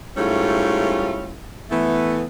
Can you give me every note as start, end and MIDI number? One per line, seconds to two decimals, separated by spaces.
0.17 1.39 44
0.17 1.39 55
0.17 1.39 57
0.17 1.39 61
0.17 1.39 64
0.17 1.39 65
1.71 2.25 52
1.71 2.25 57
1.71 2.25 59